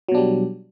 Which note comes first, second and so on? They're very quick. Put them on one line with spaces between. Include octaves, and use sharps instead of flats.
F#3 B2 D4 G3